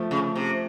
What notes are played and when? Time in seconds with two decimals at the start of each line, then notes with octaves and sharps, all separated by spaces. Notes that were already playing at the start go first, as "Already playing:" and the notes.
Already playing: F3 A3
0.11 C#3
0.36 C3